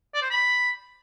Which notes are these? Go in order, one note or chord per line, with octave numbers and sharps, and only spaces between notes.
D5
C5
B5